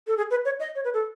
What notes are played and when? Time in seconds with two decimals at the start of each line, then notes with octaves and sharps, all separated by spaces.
0.07 A4
0.17 G#4
0.31 B4
0.45 C#5
0.60 D#5
0.75 C#5
0.84 B4
0.94 A4